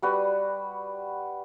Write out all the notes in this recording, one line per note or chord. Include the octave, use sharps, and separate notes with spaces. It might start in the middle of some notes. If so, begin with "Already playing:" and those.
G3 F#4 B4